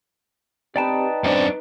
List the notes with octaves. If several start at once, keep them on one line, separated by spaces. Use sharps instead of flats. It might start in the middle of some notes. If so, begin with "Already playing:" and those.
C4 D#4 G4 B4 D5 G5 A5
F#2 C4 D4